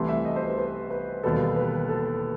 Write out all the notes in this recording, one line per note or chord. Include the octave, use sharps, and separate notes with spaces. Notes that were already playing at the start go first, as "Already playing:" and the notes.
Already playing: C2 C3 E3 A3 C6
E5
D#5
C5
B4
B4
B4
E1 D#2 D#3 G3 B3 A4
B4
A4